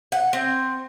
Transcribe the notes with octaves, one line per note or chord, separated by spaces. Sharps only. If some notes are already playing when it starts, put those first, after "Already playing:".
F#5
C4